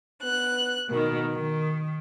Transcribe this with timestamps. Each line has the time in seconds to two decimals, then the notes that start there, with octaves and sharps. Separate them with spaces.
0.24 B3 F#6
0.89 B2 D#3 A#4
1.32 D#3